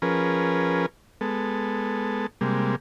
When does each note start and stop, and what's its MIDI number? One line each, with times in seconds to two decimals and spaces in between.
0.02 0.86 53
0.02 0.86 61
0.02 0.86 68
0.02 0.86 70
0.02 0.86 71
1.21 2.27 56
1.21 2.27 59
1.21 2.27 69
2.41 2.76 48
2.41 2.76 55
2.41 2.76 56
2.41 2.76 58